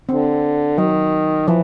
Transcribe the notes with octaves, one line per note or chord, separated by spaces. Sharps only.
D3 C4
D#3 F#3
E3 F3